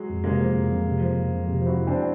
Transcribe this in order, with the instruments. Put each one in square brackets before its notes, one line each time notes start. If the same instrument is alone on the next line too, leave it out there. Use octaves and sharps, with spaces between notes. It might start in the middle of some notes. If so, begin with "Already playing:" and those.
Already playing: [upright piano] F#3 G#3
[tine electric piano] F2
[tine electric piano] C3 [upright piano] G#3 A#3
[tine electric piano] F3
F2
F2
C3
F3
F2
F2
C3
F3
[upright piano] E4 F#4
[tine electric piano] F2
[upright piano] C4 D4